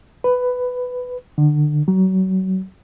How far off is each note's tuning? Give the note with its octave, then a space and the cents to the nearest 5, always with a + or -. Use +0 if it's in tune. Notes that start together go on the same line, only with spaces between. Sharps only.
B4 +10
D3 +25
F#3 +30